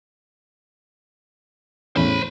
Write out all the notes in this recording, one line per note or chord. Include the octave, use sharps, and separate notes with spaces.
E2 A2 C#4 C5 B5